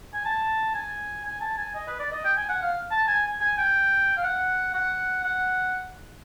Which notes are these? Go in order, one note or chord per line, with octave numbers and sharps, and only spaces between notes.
G#5
A5
G#5
G#5
A5
G#5
D#5
B4
D5
D#5
G5
G#5
F#5
F5
A5
G#5
G#5
G5
F5
F#5
F#5
F#5